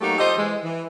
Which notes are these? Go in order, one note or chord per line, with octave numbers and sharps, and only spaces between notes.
F#3 A3 A#3 D#4 F#4 G4
F4 G4 A4 C5 D#5
E3 G#3
E3